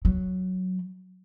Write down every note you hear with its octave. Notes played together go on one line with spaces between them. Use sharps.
F#3